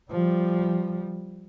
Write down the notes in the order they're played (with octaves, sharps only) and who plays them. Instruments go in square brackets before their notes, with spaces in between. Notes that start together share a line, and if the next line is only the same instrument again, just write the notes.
[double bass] F3 G3